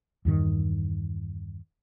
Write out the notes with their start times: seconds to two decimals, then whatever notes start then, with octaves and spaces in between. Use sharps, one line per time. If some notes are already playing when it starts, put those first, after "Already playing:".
0.25 E2 G2 D#3